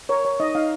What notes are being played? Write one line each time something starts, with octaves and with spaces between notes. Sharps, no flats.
A#4 C#5
C#5
D#4 D#5
D#4 F5